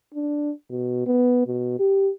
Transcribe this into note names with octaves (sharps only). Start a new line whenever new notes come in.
D4
B2
B3
B2
G4